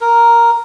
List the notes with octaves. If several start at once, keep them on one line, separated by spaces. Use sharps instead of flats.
A#4